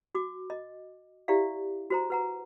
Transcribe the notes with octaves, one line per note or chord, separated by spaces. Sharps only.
F#4 D6
D#5
E4 G4 D5 E5 F5
F#4 C5 A#5
B4 F#5 A#5